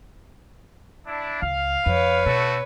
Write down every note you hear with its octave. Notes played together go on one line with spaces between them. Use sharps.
D4 E4
C#2 F5
F2 B4 C#5
B2 A3 F#4 A4